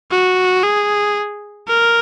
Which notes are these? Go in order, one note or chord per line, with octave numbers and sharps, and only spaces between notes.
F#4
G#4
A#4